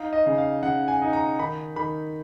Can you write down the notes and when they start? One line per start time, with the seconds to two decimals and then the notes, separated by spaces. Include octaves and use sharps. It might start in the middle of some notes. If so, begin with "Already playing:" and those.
Already playing: D#4 F5
0.13 D#5
0.26 C#3
0.38 F5
0.63 C#3 F#5
0.88 G#5
1.02 D#4
1.13 A#5
1.39 D#3 B5
1.76 D#3 B5